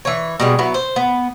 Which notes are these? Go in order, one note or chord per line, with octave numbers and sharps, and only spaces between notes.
E3 C#5
B2 G3 G#3
F#3 B3 E4
C5
B3